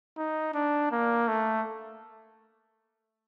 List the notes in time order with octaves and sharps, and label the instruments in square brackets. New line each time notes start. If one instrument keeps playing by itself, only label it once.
[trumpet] D#4
D4
A#3
A3